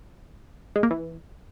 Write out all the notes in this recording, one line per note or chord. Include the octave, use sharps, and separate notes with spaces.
G#3
A#3
E3